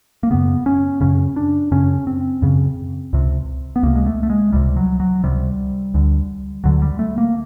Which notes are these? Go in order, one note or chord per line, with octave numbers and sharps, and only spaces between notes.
A#3
F#2 C#3 B3
C#4
F#2 C#3 C#4
D4
F#2 C#3 C#4
C4
F#2 C#3
C#2 C3
B3
C#2 C3 A#3
G#3
A3
A3
G#3
C#2 C3 G3
F#3
F#3
C#2 C3 G3
D2 D3
D2 D3 F#3
G3
A3
A#3